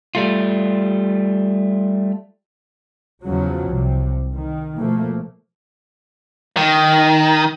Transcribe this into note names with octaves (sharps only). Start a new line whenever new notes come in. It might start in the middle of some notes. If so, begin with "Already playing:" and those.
G3 A3 F4
E2 C#3 F3 F#3
C2 C3
D#3
B2 F3 A3 A#3
D#3